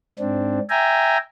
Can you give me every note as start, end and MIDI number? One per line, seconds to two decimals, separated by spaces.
0.19 0.59 44
0.19 0.59 60
0.19 0.59 62
0.70 1.18 76
0.70 1.18 79
0.70 1.18 80
0.70 1.18 82